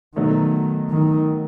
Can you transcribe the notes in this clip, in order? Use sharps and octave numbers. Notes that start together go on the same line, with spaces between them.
B2 D#3 F#3 A3 D#4
D#3